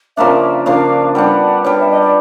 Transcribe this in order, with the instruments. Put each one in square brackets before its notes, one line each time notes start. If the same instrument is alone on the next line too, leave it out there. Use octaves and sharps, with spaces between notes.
[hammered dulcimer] C#3 F3 A#3 D4 [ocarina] E5
[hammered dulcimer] C#3 F3 A#3 D4 [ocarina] F5
[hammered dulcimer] G3 B3 D4 [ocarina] F#5
[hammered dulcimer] G3 B3 D4 [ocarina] C#5
[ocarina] E5
D#5
D5